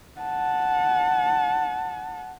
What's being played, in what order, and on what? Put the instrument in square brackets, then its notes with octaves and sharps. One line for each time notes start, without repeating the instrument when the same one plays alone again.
[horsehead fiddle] F#5 A5